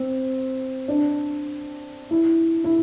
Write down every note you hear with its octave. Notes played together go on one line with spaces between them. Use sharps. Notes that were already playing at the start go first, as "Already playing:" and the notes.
Already playing: C4
D4
E4
E4